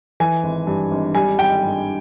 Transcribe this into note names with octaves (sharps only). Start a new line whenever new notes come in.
E3 G#5
G#1
G2
G#1
G3 G#5
G#1 G5
G2